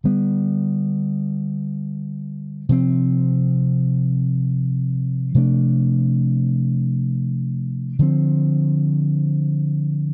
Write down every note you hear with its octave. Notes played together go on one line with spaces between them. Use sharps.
D3 G3 B3
C3 F3 C4
C3 F3 A3 D4
D3 F3 C4